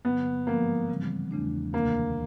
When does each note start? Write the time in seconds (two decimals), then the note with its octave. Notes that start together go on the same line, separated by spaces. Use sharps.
0.05 G2 D3 F#3 A#3 B3
0.47 G#2 F3 G#3 A#3
0.89 C#3 E3 G3 C4
1.31 E2 C#3 E3 A3 D4
1.73 D2 C3 D#3 A#3